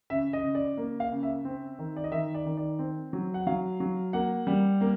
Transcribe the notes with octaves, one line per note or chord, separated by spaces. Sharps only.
C#3 E5
D#5
C#3
D5
A#3
F5
C#3
E5
C4
D#3
D5
D#5
D#3 E5
D5
D#3
D5
C4
F#3
F#5
F#3 F5
F#3
A#3 F#5
G3
A#3